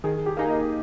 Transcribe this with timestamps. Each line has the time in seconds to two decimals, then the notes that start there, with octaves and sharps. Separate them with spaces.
0.04 D#3 G#4
0.26 G4
0.37 A#3 D#4 G#4
0.49 D#5